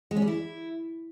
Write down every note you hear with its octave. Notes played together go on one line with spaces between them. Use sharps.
G#3
C#4
G3
E4